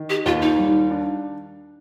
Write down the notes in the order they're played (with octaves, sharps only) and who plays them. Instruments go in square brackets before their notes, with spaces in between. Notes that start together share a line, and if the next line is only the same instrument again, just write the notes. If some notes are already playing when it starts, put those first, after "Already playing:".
Already playing: [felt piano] D#3
[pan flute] G4
[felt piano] D#2 [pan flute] F4
[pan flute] D#4
[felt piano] G3
D4